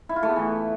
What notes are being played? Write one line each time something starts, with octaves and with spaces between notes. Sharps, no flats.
E4
F4
A3
B3
E3